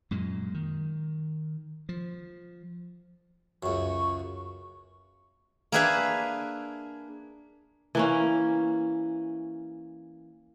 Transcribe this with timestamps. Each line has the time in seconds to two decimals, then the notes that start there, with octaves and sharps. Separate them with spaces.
0.11 F#2 A#2 G#3
0.54 D#3
1.89 F3
3.63 C#2 F#2 C#6
5.72 A#3 D4 G#4 B4 E5 G#5
7.95 E3 A#3 C#4